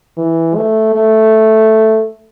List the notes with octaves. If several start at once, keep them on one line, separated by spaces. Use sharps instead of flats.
E3
A3
A3